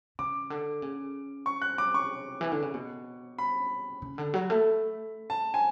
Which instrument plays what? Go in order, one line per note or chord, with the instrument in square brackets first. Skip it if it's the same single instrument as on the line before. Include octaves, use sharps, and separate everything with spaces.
[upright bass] C#3 [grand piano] D6
[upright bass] D3
C#3
[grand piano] C#6
F#6
D6
C#6
[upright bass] E3
D3
C#3
B2
[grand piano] B5
[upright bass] C#3
D3
F#3
A3
[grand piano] A5
G#5